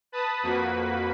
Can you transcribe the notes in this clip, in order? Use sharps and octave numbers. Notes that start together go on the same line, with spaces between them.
B4 A5 B5 D#6
F2 A#3 F#4 B4 B5